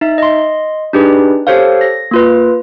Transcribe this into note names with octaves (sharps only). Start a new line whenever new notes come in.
D#4 E5
D#5 C6
D4 D#4 G4 G#4 B4
G4 A4 C5 C#5 F5
A#6
A#3 F4 B4